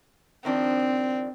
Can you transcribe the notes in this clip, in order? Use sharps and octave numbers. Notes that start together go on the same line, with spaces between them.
D#3 F3 C4 D4